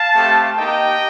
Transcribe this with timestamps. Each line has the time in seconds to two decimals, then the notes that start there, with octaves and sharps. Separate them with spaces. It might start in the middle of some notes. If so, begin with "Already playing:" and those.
Already playing: F5 A5
0.14 A3 C4 G4
0.57 A#3 D#4 G4 D#5 G5